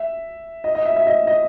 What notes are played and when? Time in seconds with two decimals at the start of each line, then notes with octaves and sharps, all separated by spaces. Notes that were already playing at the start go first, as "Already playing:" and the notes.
Already playing: E5
0.64 D#5
0.75 D#5
0.86 E5
0.96 E5
1.07 D#5
1.27 D#5